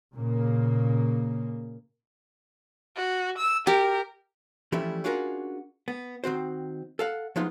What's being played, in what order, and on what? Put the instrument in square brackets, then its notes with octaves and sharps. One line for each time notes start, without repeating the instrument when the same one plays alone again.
[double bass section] A#2 C#3 A#3
[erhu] F#4
E6
[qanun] G4 [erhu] A#4
[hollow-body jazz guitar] E3 F3 G3 A3 C#4 E4
C#4 D4 F4 F#4 G#4 A#4
B3
D#3 C4 F#4 C5
A4 F5 F#5
F3 F#3 G#3 B3 D#4 F4